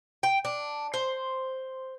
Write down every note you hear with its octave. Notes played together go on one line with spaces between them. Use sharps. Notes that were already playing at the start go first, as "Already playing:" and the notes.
G5
D4
C5